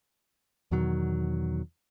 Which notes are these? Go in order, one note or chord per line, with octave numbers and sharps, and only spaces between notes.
E2 B2 D#3 F#3